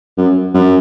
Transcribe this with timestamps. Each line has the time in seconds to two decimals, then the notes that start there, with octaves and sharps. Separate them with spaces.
0.17 F#2
0.54 F#2